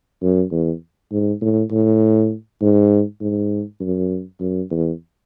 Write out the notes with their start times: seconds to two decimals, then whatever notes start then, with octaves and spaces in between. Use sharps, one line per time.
0.22 F#2
0.52 E2
1.11 G#2
1.41 A2
1.71 A2
2.61 G#2
3.21 G#2
3.80 F#2
4.40 F#2
4.70 E2